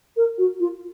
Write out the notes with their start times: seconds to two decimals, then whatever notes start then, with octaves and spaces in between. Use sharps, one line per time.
0.17 A#4
0.38 F#4
0.60 F4